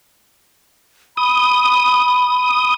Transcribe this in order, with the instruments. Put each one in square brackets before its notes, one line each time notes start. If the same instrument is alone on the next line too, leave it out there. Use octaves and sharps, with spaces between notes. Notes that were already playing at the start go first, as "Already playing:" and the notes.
[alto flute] B5 [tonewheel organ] D#6